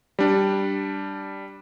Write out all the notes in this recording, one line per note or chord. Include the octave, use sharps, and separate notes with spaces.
G3 D4